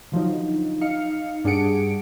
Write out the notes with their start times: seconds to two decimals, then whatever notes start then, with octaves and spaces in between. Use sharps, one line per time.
0.12 D3 F3 F#3 D#4
0.81 D#4 F5 C#7
1.44 G2 D4 G#4 F#5 C#7 D7